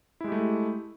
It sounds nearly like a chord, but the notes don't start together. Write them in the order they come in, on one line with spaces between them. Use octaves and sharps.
E4 G#3 G4 A3